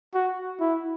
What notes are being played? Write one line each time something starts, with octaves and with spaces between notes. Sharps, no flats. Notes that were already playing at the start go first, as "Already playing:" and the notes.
F#4
E4